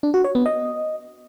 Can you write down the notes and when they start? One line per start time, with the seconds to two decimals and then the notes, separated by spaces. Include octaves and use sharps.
0.03 D4
0.14 F#4
0.24 C#5
0.35 B3
0.46 D#5